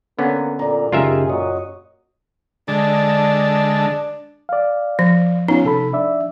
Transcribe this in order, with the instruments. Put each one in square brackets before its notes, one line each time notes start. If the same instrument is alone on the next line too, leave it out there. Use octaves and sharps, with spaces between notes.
[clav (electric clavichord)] D3 B3 C#4 [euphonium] A#3
[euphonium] A#2 [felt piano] A4 D5 A#5
[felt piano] F#2 [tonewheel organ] C#3 D#4 G4 [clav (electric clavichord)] F4 A#4 E5 [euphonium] G#4
[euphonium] A#2 [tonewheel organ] F#4 C#5 D#5
[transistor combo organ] D3 G#3 A5 [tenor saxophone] D4
[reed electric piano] D5 F5
[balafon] F3
[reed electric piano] B3 C#4 F4 [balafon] D#4
[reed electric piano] C3 A4 B5
D4 D5 E5